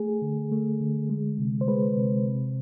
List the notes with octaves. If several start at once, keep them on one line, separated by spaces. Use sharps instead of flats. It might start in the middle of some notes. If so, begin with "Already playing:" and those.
Already playing: A3 G#4
D3
A3
D3
G#3
C3
C5
G#3 B4
C3
C3